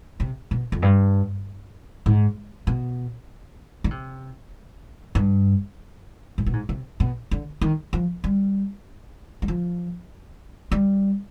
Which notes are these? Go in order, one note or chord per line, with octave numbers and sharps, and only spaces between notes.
C3
B2
F2
G2
G#2
B2
D3
C3
G2
G#2
B2
G#2
C3
B2
D3
D#3
F3
G3
G3
F3
G3